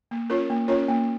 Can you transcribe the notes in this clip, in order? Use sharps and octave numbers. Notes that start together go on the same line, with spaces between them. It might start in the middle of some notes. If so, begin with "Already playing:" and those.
A#3
C#4 F4 A#4 C#5
A#3
C#4 F4 A#4 C#5
A#3